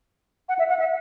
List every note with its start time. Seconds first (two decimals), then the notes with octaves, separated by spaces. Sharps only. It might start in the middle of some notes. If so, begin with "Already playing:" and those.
0.49 F#5
0.59 E5
0.69 F#5
0.79 E5